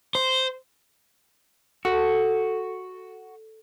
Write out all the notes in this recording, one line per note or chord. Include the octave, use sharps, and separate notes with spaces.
C5
F#4 A4